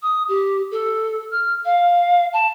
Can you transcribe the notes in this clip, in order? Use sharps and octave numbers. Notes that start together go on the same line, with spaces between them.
D#6
G4
A4
F6
F5
A5